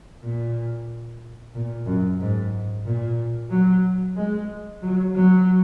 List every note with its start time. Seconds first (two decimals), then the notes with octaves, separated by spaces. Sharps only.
0.22 A#2
1.54 A#2
1.86 F#2
2.20 G#2
2.85 A#2
3.50 F#3
4.16 G#3
4.82 F#3
5.15 F#3